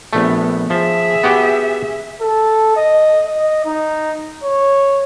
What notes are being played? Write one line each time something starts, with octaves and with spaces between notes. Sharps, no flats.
A#1 A3 B3
F3 G#4 E5
B3 F#4 G4
A4
D#5
D#5
D#4
C#5